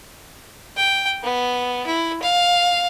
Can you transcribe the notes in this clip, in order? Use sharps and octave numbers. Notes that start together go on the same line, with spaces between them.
G5
B3
E4
F5